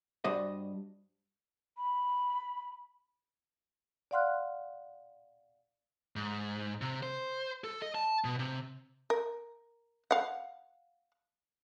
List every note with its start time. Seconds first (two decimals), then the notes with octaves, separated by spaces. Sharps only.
0.24 G2 F#4 C5 D5 D#5
1.77 B5
4.11 D5 F5 F#5 C6 F6 F#6
6.16 G#2
6.81 C3
7.03 C5
7.64 A4
7.82 D#5
7.95 A5
8.24 B2
8.39 C3
9.10 A#4
10.11 F5 F#5